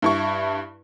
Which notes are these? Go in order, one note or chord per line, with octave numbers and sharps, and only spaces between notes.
G2 E4 C#6